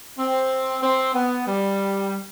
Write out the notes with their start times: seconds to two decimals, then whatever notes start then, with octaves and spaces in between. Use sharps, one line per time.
0.19 C4
0.83 C4
1.15 B3
1.47 G3